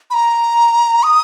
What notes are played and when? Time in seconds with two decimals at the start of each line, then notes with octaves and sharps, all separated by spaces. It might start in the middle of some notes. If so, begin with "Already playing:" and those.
0.10 B5
0.14 A#5
1.03 D#6